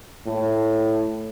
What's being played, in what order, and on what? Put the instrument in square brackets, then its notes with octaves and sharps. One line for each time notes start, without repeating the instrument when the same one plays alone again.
[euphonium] A2